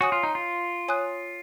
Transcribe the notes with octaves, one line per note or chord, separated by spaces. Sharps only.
F#4 C#5 G#5 D#6 F#6
F4
D#4
F4
C#5 G#5 D#6 F#6